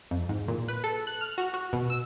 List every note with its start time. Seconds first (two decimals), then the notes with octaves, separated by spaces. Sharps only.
0.11 F2
0.29 G#2
0.48 A#2
0.68 B4
0.84 A4
1.07 F#6
1.21 F6
1.38 F#4
1.54 F#4
1.73 B2
1.90 E6